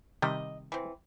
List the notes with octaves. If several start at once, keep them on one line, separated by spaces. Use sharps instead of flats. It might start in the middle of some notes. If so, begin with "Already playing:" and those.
C3 D#3 G3 D#5
E3 C4